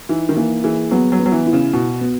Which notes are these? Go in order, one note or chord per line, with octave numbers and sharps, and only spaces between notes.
E3 D#4
D#3
E3 A#3
E3 G#4
F#3 B3
F#3
B3
F#3
E3
E4
C#3
B2 F#4
B3